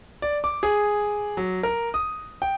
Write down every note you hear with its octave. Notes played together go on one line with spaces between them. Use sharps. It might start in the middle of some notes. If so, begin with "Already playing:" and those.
D5
D6
G#4
F#3
A#4
D#6
G5